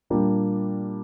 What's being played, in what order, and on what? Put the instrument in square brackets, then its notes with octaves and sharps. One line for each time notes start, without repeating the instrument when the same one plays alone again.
[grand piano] A#2 G3 A#3 D4 G4